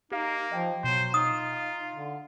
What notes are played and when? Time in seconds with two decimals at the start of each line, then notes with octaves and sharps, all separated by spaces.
0.12 A#3 D#4 G4 F5
0.52 F3 D#5 G5
0.84 B2 F#3 C5
1.14 D#4 F4 D#6
1.53 F5
1.94 D3